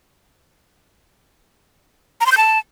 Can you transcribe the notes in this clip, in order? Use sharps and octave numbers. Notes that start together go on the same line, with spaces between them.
A#5
C6
G6
A5